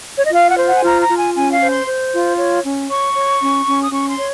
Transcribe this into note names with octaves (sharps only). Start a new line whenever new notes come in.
C#5
D#5
F4 F5
F#5
C5
F#5
G#5
F4 A#5
A#5
F4
G#5
C#4 G#5
F5
C5
C6
C5
F4
C#5
C#4
C#5 C#6
C#5
C#4
C#4
D#6
C#4 C#6
C6
C#5